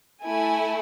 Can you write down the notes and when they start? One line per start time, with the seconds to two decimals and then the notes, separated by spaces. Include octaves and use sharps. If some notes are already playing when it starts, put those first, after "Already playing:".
0.24 A3 E4 A4 G#5